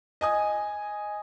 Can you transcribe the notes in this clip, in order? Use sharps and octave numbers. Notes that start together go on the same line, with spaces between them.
D#5 G#5 D#6